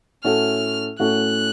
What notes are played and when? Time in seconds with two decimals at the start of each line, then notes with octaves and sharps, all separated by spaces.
0.24 A2 A3 C#4 F#4 A4 F6
0.99 A2 A3 C#4 F#4 A4 F#6